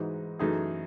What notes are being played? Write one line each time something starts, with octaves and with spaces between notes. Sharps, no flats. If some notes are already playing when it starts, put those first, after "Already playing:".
Already playing: G#2 E3 G#3 D#4 F#4
F#2 E3 A3 D#4 G#4